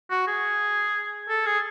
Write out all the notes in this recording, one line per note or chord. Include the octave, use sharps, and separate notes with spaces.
F#4
G#4
A4
G#4